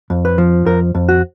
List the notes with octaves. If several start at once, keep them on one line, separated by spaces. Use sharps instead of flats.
F2
B4
F3
F2 A#4
F2
F#4